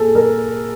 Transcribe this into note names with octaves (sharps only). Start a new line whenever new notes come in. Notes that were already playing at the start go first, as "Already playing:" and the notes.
Already playing: A#2 G#4 A4
A#4